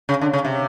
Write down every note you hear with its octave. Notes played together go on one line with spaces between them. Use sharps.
C#3
D3
C#3
C3